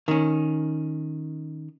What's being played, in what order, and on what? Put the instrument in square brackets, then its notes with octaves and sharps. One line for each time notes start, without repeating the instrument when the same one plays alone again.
[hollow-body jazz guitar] D#3 C#4